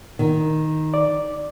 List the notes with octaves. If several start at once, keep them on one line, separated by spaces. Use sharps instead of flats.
D#3
D5